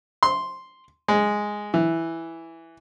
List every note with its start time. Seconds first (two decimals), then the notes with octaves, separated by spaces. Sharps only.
0.23 C6
1.08 G#3
1.74 E3